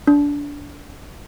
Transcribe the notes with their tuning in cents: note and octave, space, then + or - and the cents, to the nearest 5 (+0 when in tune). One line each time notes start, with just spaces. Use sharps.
D4 -25